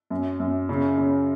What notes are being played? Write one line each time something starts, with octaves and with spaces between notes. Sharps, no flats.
F#2
F#2
C#3
C#3